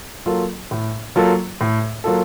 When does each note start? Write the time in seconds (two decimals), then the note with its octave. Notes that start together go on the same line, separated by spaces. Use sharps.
0.26 F#3 A#3 F4 A4
0.71 A2
1.16 F#3 A#3 F4 A4
1.61 A2
2.04 F#3 A#3 F4 A4